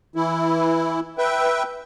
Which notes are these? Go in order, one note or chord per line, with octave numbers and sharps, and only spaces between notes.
E3 E4
B4 E5 G5